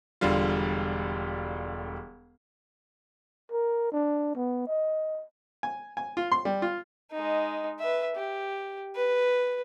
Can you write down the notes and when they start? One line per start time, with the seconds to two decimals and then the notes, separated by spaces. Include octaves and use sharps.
0.21 E1 D3 G3 F4
3.52 A#4
3.92 D4
4.35 B3
4.67 D#5
5.63 G#5
5.97 G#5
6.17 F4
6.32 C6
6.45 G3
6.62 F4
7.12 G#3 D#4
7.80 B4 E5
8.16 G4
8.96 B4